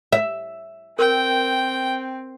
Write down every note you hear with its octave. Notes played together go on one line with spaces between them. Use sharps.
E5
C4 A#4 G5